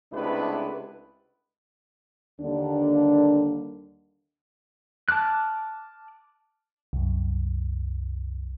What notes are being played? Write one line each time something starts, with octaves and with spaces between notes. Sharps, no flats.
C#2 C3 A3 D4 E4 B4
D#2 D3 G3 A#3 D4
A5 D6 F6 F#6
C2 F#2